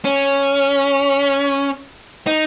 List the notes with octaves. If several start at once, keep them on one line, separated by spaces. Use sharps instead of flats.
C#4
D#4